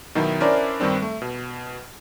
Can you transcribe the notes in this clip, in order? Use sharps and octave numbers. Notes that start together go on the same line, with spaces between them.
B2 D#3 F#3 D#4 E4
C#4 D4 E4 A#4 C5 D5
G2 D#3 G3 C4 D4
A3
B2